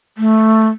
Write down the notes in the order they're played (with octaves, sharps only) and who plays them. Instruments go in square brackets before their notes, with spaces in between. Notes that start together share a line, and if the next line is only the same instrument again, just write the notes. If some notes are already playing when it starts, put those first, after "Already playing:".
[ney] A3